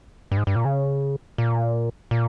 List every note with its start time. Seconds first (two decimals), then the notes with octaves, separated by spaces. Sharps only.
0.32 G2
0.37 G#2
0.47 G2
0.56 A#2
0.65 C#3
1.38 A#2
2.11 A#2